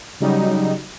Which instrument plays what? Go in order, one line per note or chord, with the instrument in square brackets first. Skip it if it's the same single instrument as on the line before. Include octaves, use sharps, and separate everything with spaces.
[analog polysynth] C#3 F#3 G3 D#4